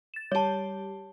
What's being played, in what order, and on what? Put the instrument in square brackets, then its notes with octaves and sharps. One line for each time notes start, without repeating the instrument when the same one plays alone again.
[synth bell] A6 E7
[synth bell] G3 G4 [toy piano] C#5 A5